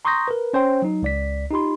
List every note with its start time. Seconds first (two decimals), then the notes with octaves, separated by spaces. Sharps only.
0.05 A#5 C6 C#6 D#6 G6 A#6
0.28 A#4 B4
0.53 C#4 C5 C#5 G5 C6
0.82 F#3 D#4
1.02 C#2 D5 B6
1.51 D#4 F4 G4 B5 C6